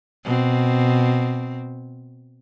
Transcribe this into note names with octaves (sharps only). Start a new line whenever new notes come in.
B2 C4